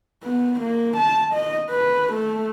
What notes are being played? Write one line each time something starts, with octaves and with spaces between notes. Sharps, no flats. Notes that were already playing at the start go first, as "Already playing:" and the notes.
B3
A#3
A5
D#5
B4
A3